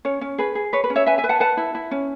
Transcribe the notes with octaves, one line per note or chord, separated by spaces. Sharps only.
C#4 C#5
C#4
G#4 B4
G#4
B4 C#5
B4
C#4
C#5 E5
B4 E5 G#5
E5 G#5
B4
F#5 A5
B4 F#5 A5
E4
E4
C#4